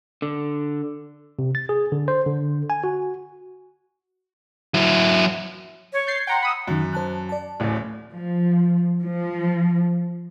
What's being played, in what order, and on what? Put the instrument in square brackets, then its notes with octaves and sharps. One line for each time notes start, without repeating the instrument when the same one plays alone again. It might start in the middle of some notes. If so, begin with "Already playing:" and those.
[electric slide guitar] D3
[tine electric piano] C3
A6
G#4
D3
C5
D3
G#5
F#4
[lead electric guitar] F#3 E4
[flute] C#5
[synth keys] G6 A6 C7
[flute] F#5 [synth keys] G5 A#5 C6
[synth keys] B5 D#6 E6
[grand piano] F#2 [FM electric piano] D#3 F#6
[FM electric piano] C5 A5 F#6
D5 A5
[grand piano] D1 A1 A2
[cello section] F3
F3